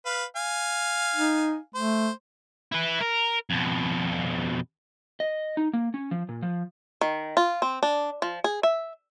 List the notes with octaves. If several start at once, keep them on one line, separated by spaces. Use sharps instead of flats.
B4 F5
F5 G#5
D#4
A3 C5
E4 B4
A#4
F2 B2
D#5
D#4
A#3
C#4
F3
A#2
F3
D#3
F4
C4
D4
F3
G#4
E5